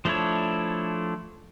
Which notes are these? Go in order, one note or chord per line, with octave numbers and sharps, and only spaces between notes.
F3 A3 D4 E4 C#5